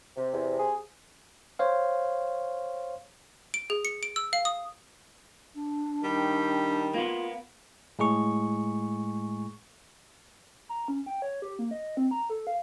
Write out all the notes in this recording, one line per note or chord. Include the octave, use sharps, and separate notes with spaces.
C3
E2
G#4
C5 C#5 F5
D7
G#4
C#7
D7
E6
F5
D#6
D4
D#3 G3
A#3 B3 F4
A2 G#3 G#4 C#6
A#5
C#4
G5
C#5
G4
A#3
D#5
C4
A#5
A4
F5